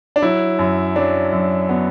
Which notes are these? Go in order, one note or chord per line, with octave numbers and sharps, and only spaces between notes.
D4
F#3 E4
F#2
F#3 D4
F#2
F#3 B3